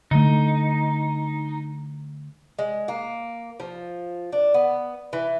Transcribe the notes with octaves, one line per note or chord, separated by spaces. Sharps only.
D3 A3 D#4
G#3
A#3
F3
D4
B3
E3